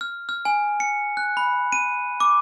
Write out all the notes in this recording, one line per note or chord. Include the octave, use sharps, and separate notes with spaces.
F6
F6
G#5
C#7
F#6
B5
D#7
D6